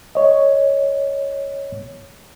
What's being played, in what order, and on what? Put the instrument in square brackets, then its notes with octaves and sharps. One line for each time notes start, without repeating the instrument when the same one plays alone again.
[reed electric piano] C#5 D#5